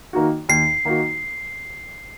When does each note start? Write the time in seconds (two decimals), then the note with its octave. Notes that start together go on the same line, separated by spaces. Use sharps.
0.13 D#3 A#3 D#4 F#4
0.49 D#2 C7
0.85 D#3 A#3 D#4 F#4